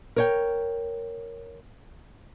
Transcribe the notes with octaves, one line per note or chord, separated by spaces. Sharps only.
A#4 C#5 G5